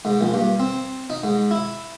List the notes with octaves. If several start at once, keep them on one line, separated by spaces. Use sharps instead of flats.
G#2
A#1
G2
C4
D#4
G#2
E4